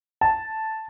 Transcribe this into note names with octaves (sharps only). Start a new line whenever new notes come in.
A5